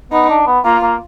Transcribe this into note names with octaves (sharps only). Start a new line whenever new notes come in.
B3 D#4
D4
B3
A#3 F4
A#3